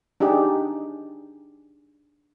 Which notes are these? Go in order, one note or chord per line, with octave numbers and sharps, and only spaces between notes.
D4 D#4 G4 G#4